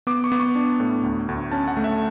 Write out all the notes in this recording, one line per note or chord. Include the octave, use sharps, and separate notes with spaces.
B3 D6
C#6
B3
C#6
D4
A2
D2
D2
C#4 A5
F#5
A3
E5